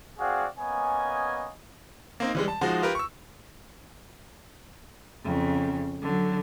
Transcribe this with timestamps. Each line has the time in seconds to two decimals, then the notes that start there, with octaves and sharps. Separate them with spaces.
0.19 C4 F#4 G#4 D5 F5 F#5
0.59 A#3 B3 C#4 D#5 G#5
2.20 A#3 C4 D#4
2.35 E3 G3 G#3
2.48 A5
2.61 F3 G#3 D#4 F#4
2.82 F4 G4 A#4 B4
2.95 C#6 E6
5.24 F2 C#3
6.02 D3 F#3